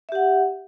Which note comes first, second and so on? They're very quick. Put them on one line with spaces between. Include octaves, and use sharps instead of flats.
E5 G4 F#5